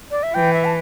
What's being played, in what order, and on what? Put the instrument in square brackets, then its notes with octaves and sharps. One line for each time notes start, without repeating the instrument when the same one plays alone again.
[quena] D5
E5
[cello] E3 [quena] G5
[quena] E5
A5